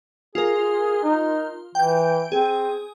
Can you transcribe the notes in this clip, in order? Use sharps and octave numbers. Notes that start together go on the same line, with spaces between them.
F4 G#4 A#4
D#4
E3 G5 G6
C4 G#4